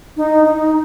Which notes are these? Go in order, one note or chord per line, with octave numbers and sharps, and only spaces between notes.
D#4
D#4